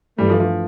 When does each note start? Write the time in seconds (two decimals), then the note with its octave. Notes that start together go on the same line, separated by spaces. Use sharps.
0.18 G2 E3 G3 A3
0.30 F3
0.40 F3